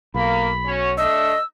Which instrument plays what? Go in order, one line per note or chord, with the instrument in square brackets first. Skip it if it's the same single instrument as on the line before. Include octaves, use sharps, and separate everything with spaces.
[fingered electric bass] B1 [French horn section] A#3 [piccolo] B5
[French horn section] C#4 F#4 C#5
[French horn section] A3 D4 [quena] D#5 [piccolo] E6